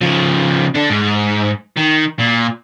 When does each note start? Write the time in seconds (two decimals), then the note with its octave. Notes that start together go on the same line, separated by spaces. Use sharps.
0.01 C#3 F3
0.75 D4 A4
0.90 G#2
1.77 D#3
2.19 A#2